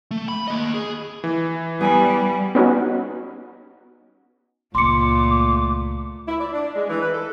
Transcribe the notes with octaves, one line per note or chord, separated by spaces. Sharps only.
A3
B5
A#3 D#5
G#4
E3
G3 B3 G#4 G#5 B5
B3 C#4 D#4 F#4
C#2 A#2 A3 C6 D6 C#7
E4
D5
D4
G#3
E3
B4
A4